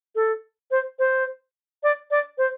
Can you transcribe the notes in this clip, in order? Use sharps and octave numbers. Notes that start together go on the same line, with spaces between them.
A4
C5
C5
D5
D5
C5